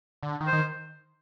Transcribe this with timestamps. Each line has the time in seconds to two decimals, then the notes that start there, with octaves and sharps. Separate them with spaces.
0.23 D3
0.40 D#3
0.48 C5
0.53 D#3